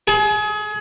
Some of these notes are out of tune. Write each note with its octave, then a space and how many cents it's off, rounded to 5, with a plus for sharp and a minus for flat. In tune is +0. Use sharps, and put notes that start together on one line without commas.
G#4 +30